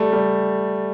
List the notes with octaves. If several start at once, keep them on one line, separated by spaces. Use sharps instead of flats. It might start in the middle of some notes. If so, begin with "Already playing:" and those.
Already playing: G3 A3
G3